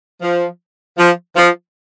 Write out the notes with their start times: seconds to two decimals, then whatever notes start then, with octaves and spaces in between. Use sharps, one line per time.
0.22 F3
0.98 F3
1.36 F3